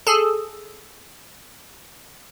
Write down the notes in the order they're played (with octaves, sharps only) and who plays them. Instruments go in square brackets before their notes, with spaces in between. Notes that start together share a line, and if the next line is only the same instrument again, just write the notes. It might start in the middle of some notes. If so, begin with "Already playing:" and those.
[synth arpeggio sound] G#4 A4